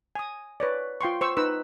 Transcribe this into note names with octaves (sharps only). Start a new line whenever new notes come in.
G#5 D#6
B4 C#5 D5
F4 G5 C6 C#6
C5 C#6 E6
D#4 B4 E6